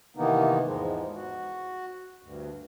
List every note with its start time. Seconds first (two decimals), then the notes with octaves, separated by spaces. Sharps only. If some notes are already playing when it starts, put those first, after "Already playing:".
0.16 C3 D#3 E3 A#3 B3 D#4
0.65 E2 G#2 F3 G#3
1.15 F#4
2.22 D2 G2